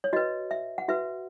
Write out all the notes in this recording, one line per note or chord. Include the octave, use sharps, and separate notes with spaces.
C#5
F#4 B4 D#5
E5
F#5
F#4 B4 E5